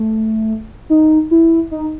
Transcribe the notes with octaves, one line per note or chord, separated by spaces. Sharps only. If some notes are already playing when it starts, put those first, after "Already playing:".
Already playing: A3
D#4
E4
D#4